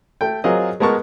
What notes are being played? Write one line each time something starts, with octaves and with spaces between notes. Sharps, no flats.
A3 G5
F#3 C4 F4 G#4 A#4 D#5
G#3 B3 A#4 A5 C#6